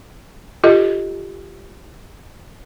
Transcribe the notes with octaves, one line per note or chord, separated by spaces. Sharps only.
F4 G4 A4 D#5